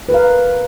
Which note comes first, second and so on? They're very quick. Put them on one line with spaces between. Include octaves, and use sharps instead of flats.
B4 A#4 F5